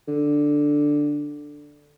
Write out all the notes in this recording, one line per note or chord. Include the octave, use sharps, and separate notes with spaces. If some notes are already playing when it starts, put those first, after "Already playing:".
D3